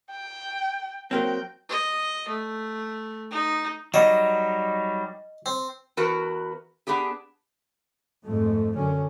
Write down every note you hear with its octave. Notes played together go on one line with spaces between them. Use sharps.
G5
F#3 A#3 C4 G5
D#5
A3
D#4
F#3 G3 D#4 D#5
C4
E2 F#4 A#4 B4
B3 D4 G4 G#4
F2 G#2 A3
F#2 D3 C#4